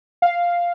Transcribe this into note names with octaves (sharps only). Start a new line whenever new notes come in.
F5